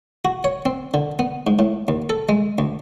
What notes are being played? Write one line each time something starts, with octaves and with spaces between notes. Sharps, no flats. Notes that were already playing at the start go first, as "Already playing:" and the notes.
F#4
C#5
C4
D3
B3
G#2
A2
D#2
A4
G#3
D2